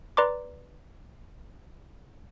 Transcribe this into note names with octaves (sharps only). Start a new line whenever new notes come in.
B4 D5 A#5 C6 D6